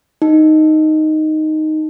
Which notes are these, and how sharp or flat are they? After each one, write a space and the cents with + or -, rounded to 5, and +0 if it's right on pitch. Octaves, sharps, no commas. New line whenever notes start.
D#4 +0